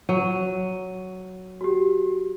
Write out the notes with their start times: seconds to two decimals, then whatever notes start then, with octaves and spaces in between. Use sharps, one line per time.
0.09 F#3 D#7
1.61 F#4 G4